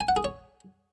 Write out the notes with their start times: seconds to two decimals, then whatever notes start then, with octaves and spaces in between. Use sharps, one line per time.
0.01 G#5
0.08 F#5
0.16 G#4
0.24 C#5